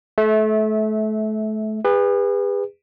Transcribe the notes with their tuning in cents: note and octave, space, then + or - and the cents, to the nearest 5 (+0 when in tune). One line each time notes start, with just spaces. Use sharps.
A3 -30 E5 -15
G#4 -45 B4 +0